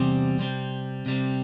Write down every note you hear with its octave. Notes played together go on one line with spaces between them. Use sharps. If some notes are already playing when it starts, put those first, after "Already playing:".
Already playing: E2 C3 G3 C4
C3 G3 C4
C3 G3 C4